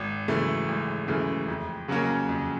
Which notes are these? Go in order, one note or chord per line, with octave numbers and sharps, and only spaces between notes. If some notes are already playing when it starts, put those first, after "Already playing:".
Already playing: G#1
F#2 C#3 E3 A3
G#1
F#2 C#3 E3 A3
F2
C#3 F#3 A#3 C#4
F2